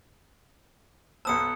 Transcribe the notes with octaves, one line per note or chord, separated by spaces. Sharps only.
B1 B3 A5 D#6 E6 C#7